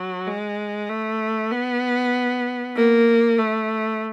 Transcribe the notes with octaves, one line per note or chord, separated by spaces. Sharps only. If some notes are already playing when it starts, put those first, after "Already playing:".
Already playing: F#3
G#3
A3
B3
A#3
A3